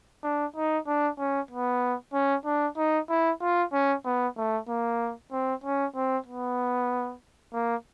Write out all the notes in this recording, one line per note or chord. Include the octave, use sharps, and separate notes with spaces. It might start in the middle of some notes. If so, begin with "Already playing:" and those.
D4
D#4
D4
C#4
B3
C#4
D4
D#4
E4
F4
C#4
B3
A3
A#3
C4
C#4
C4
B3
A#3